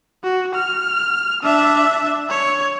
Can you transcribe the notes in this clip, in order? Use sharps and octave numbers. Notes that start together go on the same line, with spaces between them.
F#4
F6
D4 E5
C#5